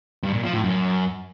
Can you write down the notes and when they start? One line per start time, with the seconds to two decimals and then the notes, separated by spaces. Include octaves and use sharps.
0.23 G2
0.33 A#2
0.43 F3
0.54 A2
0.64 F#2